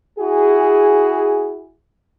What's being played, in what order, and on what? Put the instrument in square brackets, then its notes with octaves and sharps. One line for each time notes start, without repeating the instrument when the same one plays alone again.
[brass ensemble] E4 F#4 G#4